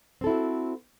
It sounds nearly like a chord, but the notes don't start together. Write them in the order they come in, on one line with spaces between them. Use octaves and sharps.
C4 A4 E4 F#4